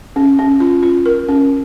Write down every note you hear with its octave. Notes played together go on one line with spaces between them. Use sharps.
C#4
C#4
F4
F4
A#4
C#4